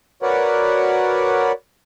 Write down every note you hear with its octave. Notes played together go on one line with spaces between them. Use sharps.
F#4 A#4 B4 C#5 D5 F#5